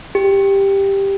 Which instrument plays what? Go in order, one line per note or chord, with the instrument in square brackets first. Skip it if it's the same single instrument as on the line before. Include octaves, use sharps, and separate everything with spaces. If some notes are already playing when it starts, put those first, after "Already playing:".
[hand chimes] G4